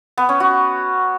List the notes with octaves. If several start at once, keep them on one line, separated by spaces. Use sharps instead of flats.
B3
C#4
F#4